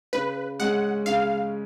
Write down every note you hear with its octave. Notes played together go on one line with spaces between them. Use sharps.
C#3 B4
G#3 C#4 F#5
C#3 F5